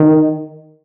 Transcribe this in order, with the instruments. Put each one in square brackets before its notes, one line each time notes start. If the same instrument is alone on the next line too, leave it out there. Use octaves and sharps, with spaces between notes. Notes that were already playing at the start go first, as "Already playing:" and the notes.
Already playing: [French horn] D#3